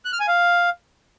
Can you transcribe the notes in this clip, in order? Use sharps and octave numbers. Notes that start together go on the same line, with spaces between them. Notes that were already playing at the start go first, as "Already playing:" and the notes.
F#6
F6
G#5
F5